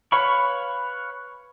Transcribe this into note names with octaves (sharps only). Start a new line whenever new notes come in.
B4 C#5 F5 B5 C#6